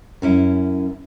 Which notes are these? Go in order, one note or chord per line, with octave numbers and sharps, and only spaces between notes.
F#2 C#4 E4